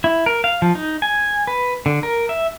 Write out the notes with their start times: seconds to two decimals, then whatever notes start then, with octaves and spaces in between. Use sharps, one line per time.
0.04 E4
0.26 A#4
0.44 F5
0.62 F3
0.75 D#4
1.02 G#5
1.47 B4
1.86 D3
2.03 A#4
2.29 E5